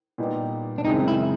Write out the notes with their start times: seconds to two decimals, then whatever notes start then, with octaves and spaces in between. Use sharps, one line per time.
0.18 A#2 G3 B3 D#4 G4
0.78 D4
0.85 F#2 C#3 E3 G#3 C4 D#4
1.08 E4